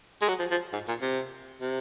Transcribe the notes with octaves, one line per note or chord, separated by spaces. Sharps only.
G#3
F#3
F3
F3
G#2
A#2
C3
C3